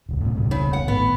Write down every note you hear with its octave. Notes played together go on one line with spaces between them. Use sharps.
D#1 C#2
A2 C#3
E1 C#2 B2
C#3
F#5
G#1 A2 D#3 B3